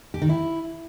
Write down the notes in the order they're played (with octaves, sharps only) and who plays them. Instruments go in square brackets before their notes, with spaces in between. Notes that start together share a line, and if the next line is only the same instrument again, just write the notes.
[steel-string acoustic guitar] G4
D#3
E4